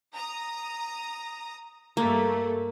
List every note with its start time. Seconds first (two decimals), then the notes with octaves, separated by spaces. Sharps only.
0.14 A#5 D#6
1.97 G2 A3 A#3